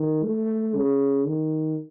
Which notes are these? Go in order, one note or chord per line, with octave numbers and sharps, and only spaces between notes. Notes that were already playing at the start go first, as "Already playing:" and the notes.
Already playing: D#3
A3
C#3
D#3